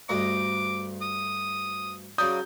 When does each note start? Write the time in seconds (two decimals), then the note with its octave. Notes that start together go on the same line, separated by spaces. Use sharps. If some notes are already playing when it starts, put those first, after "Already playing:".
0.09 D2 G2 D#5 D6
1.02 D#6
2.18 C#3 F#3 D5 D#6 G6